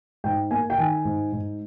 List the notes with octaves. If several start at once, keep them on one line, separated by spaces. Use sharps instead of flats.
G#2 G5
A#3 G#5
G5
D#3 G#5
G#2
G#2